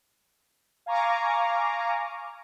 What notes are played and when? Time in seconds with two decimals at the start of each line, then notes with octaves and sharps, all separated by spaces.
0.86 F5 G#5 A#5 C#6 D6